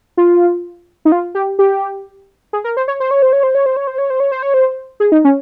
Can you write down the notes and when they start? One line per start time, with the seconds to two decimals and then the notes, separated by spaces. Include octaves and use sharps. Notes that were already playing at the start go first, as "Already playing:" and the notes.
0.17 F4
1.05 D#4
1.12 F4
1.35 G4
1.59 G4
2.53 G#4
2.64 A#4
2.77 C5
2.88 C#5
3.00 C5
3.11 C#5
3.22 C5
3.33 C#5
3.43 C5
3.55 C#5
3.66 C5
3.76 C#5
3.87 C5
3.98 C#5
4.10 C5
4.20 C#5
4.32 C5
4.42 C#5
4.54 C5
5.00 G#4
5.12 D#4
5.25 C#4